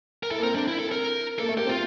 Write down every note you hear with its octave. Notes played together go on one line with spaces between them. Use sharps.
A#4
E4 A4
A#3
C4 A#4
C4 D4
E4
A4
A#4
A#3 A4
A3
A#3 G4
C4
F4